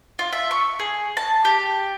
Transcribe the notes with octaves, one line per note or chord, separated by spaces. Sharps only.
F4
E5
C#6
G#4
A5
G4